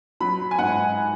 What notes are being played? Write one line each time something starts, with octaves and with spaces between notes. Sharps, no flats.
F#3 B5
G#5
G#2 F#5